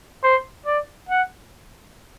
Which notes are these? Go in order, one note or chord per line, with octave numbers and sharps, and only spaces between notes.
C5
D5
F#5